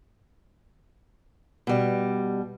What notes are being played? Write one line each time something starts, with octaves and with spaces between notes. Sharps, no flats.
B2 G3